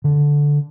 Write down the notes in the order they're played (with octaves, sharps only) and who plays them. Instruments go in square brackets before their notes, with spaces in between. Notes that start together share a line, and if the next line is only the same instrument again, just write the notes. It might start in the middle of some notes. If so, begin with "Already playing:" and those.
[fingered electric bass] D3